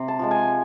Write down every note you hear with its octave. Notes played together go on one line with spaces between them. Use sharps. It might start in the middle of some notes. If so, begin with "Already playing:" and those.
Already playing: C3
A5
F3 G#3 A5
G#5